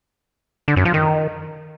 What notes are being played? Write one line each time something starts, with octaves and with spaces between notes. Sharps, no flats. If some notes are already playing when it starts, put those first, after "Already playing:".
D3
F#2
F3
D#3